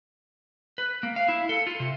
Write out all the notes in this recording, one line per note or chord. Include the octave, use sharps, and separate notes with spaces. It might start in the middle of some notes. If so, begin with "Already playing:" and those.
B4
A#3
F5
E4
A4
F4
C3